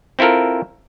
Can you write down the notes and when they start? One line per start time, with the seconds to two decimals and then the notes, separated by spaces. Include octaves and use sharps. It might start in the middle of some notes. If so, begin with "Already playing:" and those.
0.19 C4 E4 F4 A4 A#4